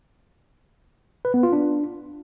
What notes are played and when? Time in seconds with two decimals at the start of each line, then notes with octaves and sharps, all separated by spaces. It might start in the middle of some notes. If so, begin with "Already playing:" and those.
1.25 B4
1.34 B3
1.43 F4
1.53 D4